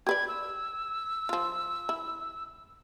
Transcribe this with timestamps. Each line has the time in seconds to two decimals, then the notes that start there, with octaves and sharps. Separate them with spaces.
0.07 G4 B4 D5 G#6
0.28 E6
1.29 F3 F4
1.89 E4